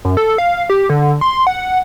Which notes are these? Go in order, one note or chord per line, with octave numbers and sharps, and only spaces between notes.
F#2
A4
F5
G4
D3
C6
F#5